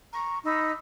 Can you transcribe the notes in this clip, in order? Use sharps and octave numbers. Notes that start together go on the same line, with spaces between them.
A#5 C#6
D#4 B5 E6